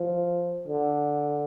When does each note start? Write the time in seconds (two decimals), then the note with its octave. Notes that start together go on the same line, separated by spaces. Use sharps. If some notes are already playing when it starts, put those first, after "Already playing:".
Already playing: F3
0.67 D3